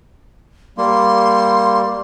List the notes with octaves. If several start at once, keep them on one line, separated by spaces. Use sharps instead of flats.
G3 A#3 C6